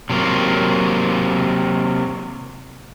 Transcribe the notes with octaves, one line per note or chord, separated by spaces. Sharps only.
C3 F#3 A#3